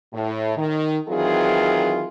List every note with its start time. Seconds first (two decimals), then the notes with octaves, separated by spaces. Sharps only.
0.13 A2
0.57 D#3
1.08 D#3 E3 F#3 C4 F4 G#4